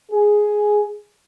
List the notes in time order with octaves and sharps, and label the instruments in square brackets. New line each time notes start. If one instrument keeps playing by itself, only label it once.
[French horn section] G#4